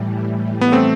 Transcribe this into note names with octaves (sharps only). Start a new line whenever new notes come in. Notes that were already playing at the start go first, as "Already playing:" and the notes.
Already playing: A2 E3 G3
B3
A3 C4